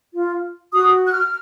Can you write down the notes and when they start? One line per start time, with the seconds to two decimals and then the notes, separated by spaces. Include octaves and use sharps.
0.14 F4
0.73 F#4 D#6
1.06 F#6
1.12 F6